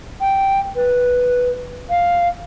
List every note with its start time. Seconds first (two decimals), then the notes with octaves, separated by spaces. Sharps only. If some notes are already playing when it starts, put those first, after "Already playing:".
0.21 G5
0.76 B4
1.90 F5